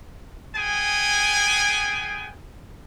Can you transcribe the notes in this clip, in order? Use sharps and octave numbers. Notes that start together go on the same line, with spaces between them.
B3 G#4 G5 G#5